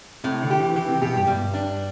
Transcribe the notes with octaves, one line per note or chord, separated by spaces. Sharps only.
A2 C3
D3
G4
E3
E3 G4
C3
B2 G4
G2
G2 G3
D4